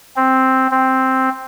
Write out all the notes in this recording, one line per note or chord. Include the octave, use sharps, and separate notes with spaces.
C4
C4